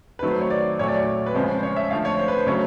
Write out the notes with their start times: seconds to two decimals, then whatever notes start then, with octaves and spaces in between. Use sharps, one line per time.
0.19 D#3 F#3 A3 B4
0.30 C5
0.41 C#5
0.50 D5
0.79 A#2 F#3 A3 C#5
0.88 D5
0.98 C#5
1.26 B4
1.34 C#3 F3 G#3 C5
1.58 C5
1.63 C#5
1.76 E5
1.90 D3 F3 A3 F5
2.05 C#5
2.19 C5
2.28 B4
2.38 C5
2.47 C#3 F#3 A3 C#5